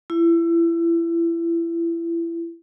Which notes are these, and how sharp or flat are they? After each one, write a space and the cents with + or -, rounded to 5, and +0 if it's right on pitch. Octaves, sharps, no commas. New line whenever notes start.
E4 +30